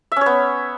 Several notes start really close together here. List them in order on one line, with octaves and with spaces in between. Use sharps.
E5 C#4 C#5 B3